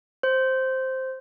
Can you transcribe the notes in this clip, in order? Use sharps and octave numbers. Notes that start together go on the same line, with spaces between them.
C5